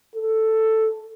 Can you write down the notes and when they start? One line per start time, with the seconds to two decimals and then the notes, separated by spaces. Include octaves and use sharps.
0.15 A4